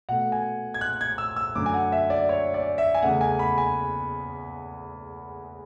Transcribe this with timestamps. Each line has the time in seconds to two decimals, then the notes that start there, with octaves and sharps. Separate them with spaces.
0.09 B2 A3 F#5
0.32 G#5
0.74 G#6
0.81 F#6
1.01 G#6
1.18 E6
1.36 E6
1.55 F#2 D3 A3 D6
1.66 G#5
1.74 F#5
1.92 E5
2.10 D5
2.29 C#5
2.54 D5
2.78 E5
2.95 G#5
3.02 E2 C#3 E3 A3 F#5
3.21 G#5
3.39 B5
3.58 G#5